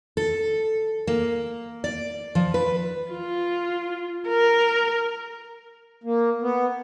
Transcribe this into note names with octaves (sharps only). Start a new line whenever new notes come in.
A4
A#3
D5
F3
B4
F4
A#4
A#3
B3